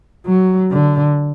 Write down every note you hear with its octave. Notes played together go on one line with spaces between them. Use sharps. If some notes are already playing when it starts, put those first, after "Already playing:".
F#3
D3